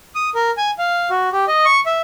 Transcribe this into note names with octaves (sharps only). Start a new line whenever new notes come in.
D#6
A#4
G#5
F5
F#4
G4
D#5
C#6
E5